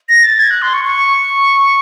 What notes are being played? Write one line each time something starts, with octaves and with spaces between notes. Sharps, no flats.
A#6
A6
G#6
F#6
C6
C#6
C#6